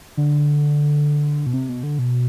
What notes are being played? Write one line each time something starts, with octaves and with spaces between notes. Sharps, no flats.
D3
B2
C3
B2
D3
B2